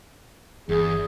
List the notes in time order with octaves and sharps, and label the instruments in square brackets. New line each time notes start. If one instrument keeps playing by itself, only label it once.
[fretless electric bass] G1 [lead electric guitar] E2 [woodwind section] G#4